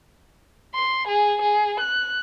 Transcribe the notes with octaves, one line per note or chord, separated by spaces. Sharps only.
C6
G#4
G#4
F#6